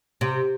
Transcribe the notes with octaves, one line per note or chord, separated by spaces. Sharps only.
C3